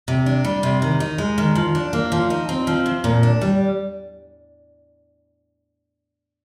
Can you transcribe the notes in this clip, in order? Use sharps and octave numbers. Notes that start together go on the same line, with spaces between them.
C3
D4
G3
C3
D#3
D#4
G#3
D#3
F3
D4
A#3
F3
D#4
C4
F3
C3
A#2
D4
G3